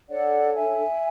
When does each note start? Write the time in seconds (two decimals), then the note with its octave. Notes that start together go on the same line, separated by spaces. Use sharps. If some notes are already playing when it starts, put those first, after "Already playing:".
0.09 D4 A4 C#5 D5 F#5
0.55 E5 G#5